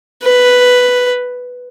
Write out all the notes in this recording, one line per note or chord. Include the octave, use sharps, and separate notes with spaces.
B4